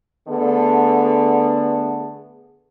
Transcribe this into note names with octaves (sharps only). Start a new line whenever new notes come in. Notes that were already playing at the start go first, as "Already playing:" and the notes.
D3 A3 B3 G#4 A4